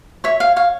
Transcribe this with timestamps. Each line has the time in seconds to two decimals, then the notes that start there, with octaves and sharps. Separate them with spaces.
0.24 C#5 E5
0.40 F5
0.56 C#5 F5